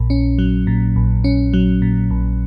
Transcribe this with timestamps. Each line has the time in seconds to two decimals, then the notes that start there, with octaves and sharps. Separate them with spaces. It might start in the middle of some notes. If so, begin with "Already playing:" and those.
Already playing: A#1 A#2
0.10 C#4
0.38 F#3
0.67 A#2
0.96 A#1
1.24 C#4
1.53 F#3
1.82 A#2
2.11 A#1